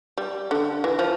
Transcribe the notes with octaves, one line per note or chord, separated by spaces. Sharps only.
G3
D3
E3
F3